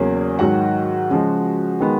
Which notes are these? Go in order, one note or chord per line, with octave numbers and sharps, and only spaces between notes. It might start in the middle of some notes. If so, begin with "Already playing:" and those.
Already playing: E2 C#3 F#3 A#3 C#4 G#4
G#2 D#3 F#3 F#4 F#5
C#3 F3 G#3
D#3 G#3 B3